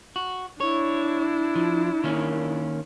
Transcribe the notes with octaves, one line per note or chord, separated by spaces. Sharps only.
F#4
D4 E4 C#5
F3
D#3 A#3 C#4